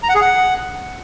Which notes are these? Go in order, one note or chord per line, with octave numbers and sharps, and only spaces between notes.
A#5
F#5
G#4
F#5